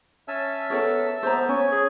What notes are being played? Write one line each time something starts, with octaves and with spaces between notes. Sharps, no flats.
C#4 E5 A5 E6
B3 A4 A#4 C#5
B3 C5 A#5
C#4 C#5 G#5
G#4